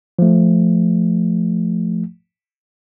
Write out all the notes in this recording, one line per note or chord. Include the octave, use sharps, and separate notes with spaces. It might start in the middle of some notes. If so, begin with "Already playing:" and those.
F3 A3